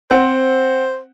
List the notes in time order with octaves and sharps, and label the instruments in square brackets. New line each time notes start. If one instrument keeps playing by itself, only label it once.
[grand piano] C4 F#5 [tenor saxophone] C5